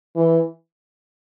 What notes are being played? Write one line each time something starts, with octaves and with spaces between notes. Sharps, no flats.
E3